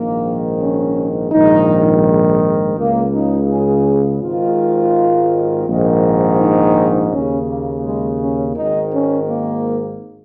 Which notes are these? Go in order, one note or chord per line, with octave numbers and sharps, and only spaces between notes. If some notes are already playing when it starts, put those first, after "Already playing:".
Already playing: A#1 G#2 D#3 A#3
C#4
A#1 G#2 D#3 D#4
C#2 C#3 A#3
D#4
G#4
G#1 G#2 D#3 F4
A#1 G#2 D#3
D#4
D#2 C#3 C#4
A#3
G#3
C#4
G#1 G#2 D#3 D#4
C#4
A#3